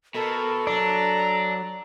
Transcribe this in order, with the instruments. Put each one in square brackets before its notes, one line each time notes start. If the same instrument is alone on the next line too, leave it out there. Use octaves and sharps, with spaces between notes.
[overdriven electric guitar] B2 [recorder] A4 [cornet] A#4
[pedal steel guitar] F#3 D5 [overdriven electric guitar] D4 [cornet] A#5